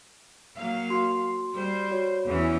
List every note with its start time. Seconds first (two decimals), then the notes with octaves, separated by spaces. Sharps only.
0.56 F#3 A#3 F5
0.90 F#4 C6
1.55 G3 C5
1.91 F#4 C#5
2.26 E2 E3 C#4